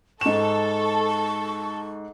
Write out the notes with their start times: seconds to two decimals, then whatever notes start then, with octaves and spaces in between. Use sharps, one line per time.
0.21 G#2 A4 C#6 E7